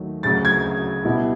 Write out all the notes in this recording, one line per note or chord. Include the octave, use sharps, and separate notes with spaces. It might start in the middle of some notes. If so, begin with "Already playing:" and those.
Already playing: D#2 D#3 F#3 A3
D2 C#3 F#3 A6
G#6
B2 G3 B3 E4